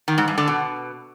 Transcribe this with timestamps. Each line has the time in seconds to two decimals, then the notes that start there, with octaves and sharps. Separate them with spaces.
0.08 D#3
0.18 G#2
0.28 G2
0.38 D3
0.48 B2